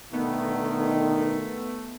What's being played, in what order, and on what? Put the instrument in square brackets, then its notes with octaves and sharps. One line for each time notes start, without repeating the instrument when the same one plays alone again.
[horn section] B2 D3 D#3 [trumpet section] A3 [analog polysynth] B3